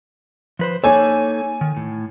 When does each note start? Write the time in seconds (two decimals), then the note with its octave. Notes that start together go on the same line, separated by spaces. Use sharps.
0.59 F3 B4 C5
0.84 A#3 D#4 A4 C#5 G#5
1.61 D#3
1.77 A2